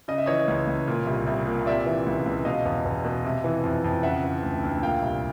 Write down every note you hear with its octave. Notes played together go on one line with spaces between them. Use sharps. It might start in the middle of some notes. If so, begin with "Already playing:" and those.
C#3 D#5
E5
E3 C#5 D#5
C#2
C#2
A#2
C2
C2
A#2
C3 D5 E5
E3
C#2
C#2
B2 D#5 F5
E2
E2
B2
C3
E3
F2
F2
C#3 E5 F#5
E3
D2
D2
A#2 F5 G5
C2